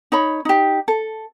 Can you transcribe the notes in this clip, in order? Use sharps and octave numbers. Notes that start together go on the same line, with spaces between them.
D#4 C#5 B5
D#4 G4
A4